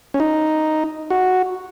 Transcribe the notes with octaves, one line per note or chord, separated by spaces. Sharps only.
C#4
D#4
F#4